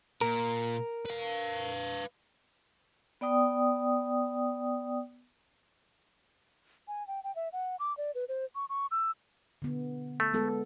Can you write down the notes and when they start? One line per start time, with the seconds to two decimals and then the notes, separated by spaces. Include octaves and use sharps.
0.21 A#2 A#4
1.06 B4 F5
3.21 B3 D5 G5 D#6
6.88 G#5
7.08 G5
7.24 G5
7.36 E5
7.53 F#5
7.80 D6
7.97 D5
8.15 B4
8.28 C5
8.55 C#6
8.70 C#6
8.91 E6
9.62 D3 B3
10.20 A3
10.33 G#3 B3 A4